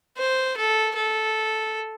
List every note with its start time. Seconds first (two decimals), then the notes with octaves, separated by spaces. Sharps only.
0.18 C5
0.57 A4
0.96 A4